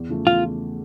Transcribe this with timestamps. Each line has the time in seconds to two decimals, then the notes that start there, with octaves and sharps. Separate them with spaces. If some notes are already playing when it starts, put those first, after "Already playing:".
Already playing: E2
0.09 C#3 F3 A3
0.26 E2 F4